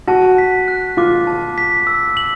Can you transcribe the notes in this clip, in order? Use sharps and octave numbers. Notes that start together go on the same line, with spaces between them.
F#4 A5
B6
F#6
F4 D6
A5
B6
E6
F#7